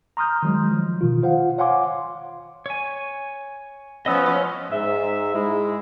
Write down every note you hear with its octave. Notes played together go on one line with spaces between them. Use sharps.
A#5 C6 D#6 F6 G6
D#3 F#3 G#3
F3
B2 D#3 F4
F4 C5 F5 F#5
C#5 F5 F#5 G#5 C6 D6
C#5 G#5
F3 B3 C#4 D#5 E6 F6
G#2 E5
G#2 G#3 E4